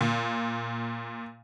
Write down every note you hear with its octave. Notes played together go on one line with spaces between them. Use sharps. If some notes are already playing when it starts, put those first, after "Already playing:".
A#2